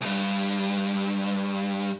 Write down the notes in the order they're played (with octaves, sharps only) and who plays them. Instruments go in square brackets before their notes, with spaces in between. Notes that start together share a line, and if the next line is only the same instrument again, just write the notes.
[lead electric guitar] C2 G2